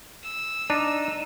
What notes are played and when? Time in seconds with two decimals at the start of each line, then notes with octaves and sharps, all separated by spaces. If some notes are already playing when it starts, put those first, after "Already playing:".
0.23 E6
0.70 D4 D#4